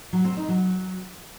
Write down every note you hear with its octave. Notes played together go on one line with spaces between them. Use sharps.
F#3
C4
D#4
F#3